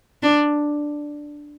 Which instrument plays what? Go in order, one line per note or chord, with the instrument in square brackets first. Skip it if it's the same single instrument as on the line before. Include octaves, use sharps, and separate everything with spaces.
[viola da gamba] D4